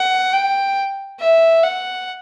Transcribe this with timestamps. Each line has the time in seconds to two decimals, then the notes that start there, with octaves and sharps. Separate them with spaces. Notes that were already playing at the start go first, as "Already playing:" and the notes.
Already playing: F#5
0.33 G5
1.20 E5
1.63 F#5